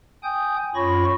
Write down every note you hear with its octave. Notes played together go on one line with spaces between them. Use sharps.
G5 G#5 D#6 G6
F#2 F4 C#5 B5 C#6 A#6